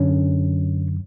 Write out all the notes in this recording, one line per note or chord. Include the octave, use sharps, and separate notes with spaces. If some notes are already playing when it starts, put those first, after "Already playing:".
Already playing: F#2 D3 C#4